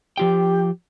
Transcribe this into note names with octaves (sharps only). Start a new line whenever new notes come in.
F3 F4 G4 G5